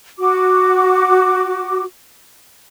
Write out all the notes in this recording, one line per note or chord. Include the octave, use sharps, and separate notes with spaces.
F#4 D6